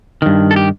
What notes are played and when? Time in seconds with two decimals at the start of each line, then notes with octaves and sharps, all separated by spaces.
0.22 G2 D#3
0.51 A4
0.56 G4